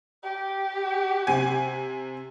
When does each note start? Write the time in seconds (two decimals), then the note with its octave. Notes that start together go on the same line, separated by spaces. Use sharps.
0.23 G4
1.27 C3 G#5